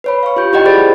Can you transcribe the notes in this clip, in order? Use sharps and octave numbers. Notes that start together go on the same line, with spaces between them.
B4 C#5 B5
F5 C#6
F4 G4 G6
E4 G4 D5 D#5 F#5 G5
G4 G#4 C5 B5 A6